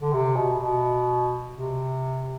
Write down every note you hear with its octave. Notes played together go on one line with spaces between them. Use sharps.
D3
C3
B2
B2
C3